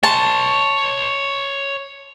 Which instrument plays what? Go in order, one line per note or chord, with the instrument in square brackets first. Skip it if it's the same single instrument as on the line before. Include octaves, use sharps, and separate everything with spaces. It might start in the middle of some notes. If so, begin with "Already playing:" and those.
[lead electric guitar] C#5 C6 [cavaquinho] A5